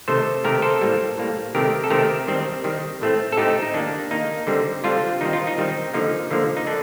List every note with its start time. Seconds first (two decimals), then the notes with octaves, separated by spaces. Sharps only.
0.08 C3 D#3 A3 A4 C5
0.44 C3 D#3 A3 G4 A#4
0.62 A4 C5
0.81 A2 G3 A#3
1.17 A2 G3 A#3
1.55 C3 D#3 A3 C4 G4 A#4
1.84 A4
1.90 C3 D#3 A3 C4 G4 A#4
2.28 D#3 G3 C4
2.64 D#3 G3 C4
3.01 A2 A3 C4
3.32 A4
3.37 A2 A3 C4 D#4 G4
3.62 D#4
3.74 D#3 A#3 D4
4.11 D#3 A#3 D#4
4.47 D3 G3 C4
4.84 D3 G3 C4 D4 F4
5.21 D#3 G3 C4 D#4
5.33 F4
5.47 D#4
5.58 D#3 G3 C4
5.94 D3 F3 A#3 D#4
6.31 D3 F3 A#3
6.57 D#4
6.67 D3 D4